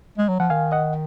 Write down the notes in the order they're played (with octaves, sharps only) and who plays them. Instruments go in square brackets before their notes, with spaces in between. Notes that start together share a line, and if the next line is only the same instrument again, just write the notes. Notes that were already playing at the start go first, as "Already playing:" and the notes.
[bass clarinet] G#3
F#3
[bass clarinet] F3 [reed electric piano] F#5
[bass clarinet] D#3 [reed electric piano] F5 G#5
[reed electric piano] D#5 F#5